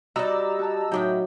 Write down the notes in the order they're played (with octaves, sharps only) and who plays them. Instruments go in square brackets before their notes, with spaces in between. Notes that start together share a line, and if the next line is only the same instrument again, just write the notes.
[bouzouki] G3 D#4 D5 [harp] F#4 [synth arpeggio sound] D#5 A#5 E6
[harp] F#4 A5
[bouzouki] A2 G#3 G5 [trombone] F#3 [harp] D#4 D6 D#6